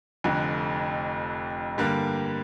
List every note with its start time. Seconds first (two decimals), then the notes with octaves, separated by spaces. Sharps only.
0.24 F1 F2 D3
1.78 G2 D3 G3 A#3